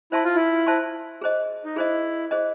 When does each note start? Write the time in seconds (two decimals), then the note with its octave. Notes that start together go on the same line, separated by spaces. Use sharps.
0.12 E4 C5 E5 A5 C6
0.24 F4
0.35 E4
0.67 C5 E5 A5 C6
1.21 G#4 C5 D#5
1.65 D#4
1.76 E4 G#4 C5 D#5
2.31 G#4 C5 D#5